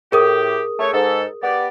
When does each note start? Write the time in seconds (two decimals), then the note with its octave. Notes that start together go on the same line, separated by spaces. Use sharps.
0.12 A2 G4 G#4 A#4 D#6
0.80 A3 C#5
0.93 G#2 A4
1.43 B3 G4 D5